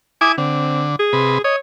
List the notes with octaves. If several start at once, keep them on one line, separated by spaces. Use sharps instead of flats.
E4 G#5 D6 D#6
D3 C4
G#4
C3 B4
C#5 D#5